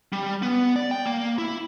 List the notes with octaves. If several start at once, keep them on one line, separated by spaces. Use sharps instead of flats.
G3
B3
D5
G5
A#3
E4